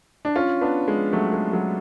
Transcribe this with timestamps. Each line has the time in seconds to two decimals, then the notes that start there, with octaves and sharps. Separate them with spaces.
0.25 D4
0.36 C#4 F4
0.61 B3 D4
0.88 G#3
1.13 F#3 A3
1.33 G#3
1.53 F#3